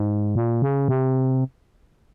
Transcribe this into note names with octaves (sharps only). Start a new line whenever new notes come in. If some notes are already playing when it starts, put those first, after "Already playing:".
Already playing: G#2
A#2
C#3
C3